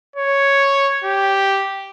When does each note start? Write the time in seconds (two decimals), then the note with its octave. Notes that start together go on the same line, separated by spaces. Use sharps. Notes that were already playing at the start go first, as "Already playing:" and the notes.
0.16 C#5
1.04 G4